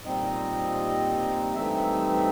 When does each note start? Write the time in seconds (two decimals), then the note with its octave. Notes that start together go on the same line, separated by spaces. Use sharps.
0.05 A#2 G3 C4 D#4 D#5
1.54 G2 E3 A3 C4 D#4 E5